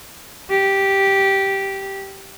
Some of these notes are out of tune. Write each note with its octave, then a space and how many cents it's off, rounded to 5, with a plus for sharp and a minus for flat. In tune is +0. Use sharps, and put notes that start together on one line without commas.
G4 -5